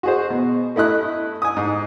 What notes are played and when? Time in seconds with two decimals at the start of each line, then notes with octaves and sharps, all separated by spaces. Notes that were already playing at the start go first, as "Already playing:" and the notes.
0.03 F#4 G#4 C5
0.30 B2
0.76 A3 E4 D#5 F#6
1.42 G#5 D#6
1.56 G#2